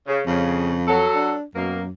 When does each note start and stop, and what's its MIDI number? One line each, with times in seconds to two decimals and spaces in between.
0.07 0.22 49
0.26 1.09 41
0.26 0.76 49
0.88 1.33 54
0.88 1.33 69
1.15 1.44 62
1.55 1.91 42
1.55 1.83 47
1.55 1.83 58